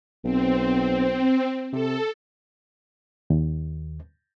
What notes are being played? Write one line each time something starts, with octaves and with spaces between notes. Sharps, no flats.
B1 C4
C3 A4
D#2